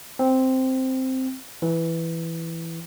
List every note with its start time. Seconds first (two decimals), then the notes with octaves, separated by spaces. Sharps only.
0.19 C4
1.62 E3